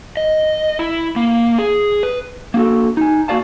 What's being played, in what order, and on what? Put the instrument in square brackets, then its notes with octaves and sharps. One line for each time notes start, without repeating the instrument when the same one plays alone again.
[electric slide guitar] D#5
E4
A#3
G#4
B4
A#3 D4 F#4 A4
D#4 G#5
A#3 F#4 D5 F5 A5